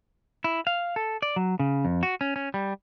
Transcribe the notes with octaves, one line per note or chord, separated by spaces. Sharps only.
E4
F5
A4
D5
F#3
C#3
F2
F#4
C#4
C#4
G3